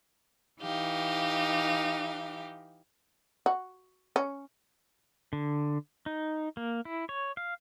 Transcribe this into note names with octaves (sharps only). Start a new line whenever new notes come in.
E3 D#4 G4 F5
F#4
C#4
D3
D#4
A#3
E4
C#5
F5